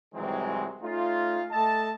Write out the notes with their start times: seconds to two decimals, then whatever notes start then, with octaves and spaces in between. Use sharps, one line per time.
0.14 C2 D#3 E3 F#3 G#3 C4
0.83 A3 C#4 D#4 F4
1.52 A3 A4 D#5 A5